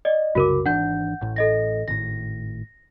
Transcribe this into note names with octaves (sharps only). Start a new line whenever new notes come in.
D5 D#5
C2 F#2 C#3 F#4 A#4 D6
G#1 E3 D4 F#5 G6
A1 A2
A4 D#5 A#6
G#1 A2 A#6